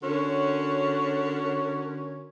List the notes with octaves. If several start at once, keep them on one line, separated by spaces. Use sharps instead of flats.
D3 C#4 F#4 A#4 C#5